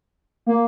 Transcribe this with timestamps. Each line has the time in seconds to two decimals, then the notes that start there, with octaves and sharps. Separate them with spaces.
0.46 A#3